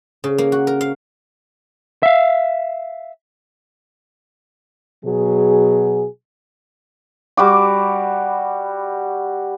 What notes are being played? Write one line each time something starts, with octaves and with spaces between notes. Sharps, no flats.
C#3
A#3
F#4
A#4
F5
E5 F5
B2 F#3 G#4
G3 F#4 D6